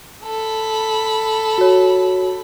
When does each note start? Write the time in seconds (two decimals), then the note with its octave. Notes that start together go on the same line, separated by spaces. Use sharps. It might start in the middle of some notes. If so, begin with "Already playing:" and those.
0.23 A4 B5
1.58 F#4 C#5